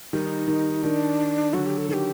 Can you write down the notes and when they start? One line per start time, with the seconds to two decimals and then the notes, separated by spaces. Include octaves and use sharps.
0.13 D#3 G3 D#4
0.48 D#3
0.83 D#3 D4
1.53 D3 F#3 F#4
1.66 G4
1.78 A4
1.89 D#3 A4
1.93 G4